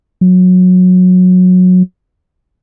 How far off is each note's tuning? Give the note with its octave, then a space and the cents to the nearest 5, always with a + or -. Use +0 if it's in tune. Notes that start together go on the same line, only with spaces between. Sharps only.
F#3 -20